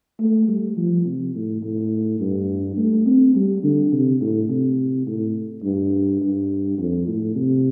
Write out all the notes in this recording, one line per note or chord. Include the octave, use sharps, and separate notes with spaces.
A3
G3
F3
C3
A2
A2
G2
A3
C4
G3
D3
C3
A2
C3
A2
G2
G2
F2
A2
C3